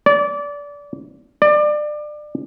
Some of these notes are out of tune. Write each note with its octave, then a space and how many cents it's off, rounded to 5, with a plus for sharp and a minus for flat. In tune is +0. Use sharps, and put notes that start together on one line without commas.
D5 -25
D5 +25